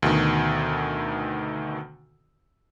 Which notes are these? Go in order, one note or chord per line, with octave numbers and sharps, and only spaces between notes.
D2 B2 D#3